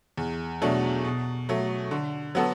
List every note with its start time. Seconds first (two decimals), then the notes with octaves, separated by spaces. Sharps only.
0.18 E2
0.62 B2 F#3 A3 D4
1.05 B2
1.49 F#3 A3
1.91 D3
2.35 F#3 B3 F#4 A4